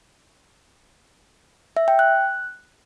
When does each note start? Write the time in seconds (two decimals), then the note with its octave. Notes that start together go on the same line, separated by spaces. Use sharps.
1.77 E5
1.88 G5
1.99 F#6